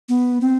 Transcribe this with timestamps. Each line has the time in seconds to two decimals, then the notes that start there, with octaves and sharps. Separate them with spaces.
0.09 B3
0.41 C4